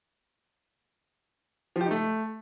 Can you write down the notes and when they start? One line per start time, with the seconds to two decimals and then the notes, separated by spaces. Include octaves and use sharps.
1.76 F3
1.81 G4
1.86 D#4
1.91 A3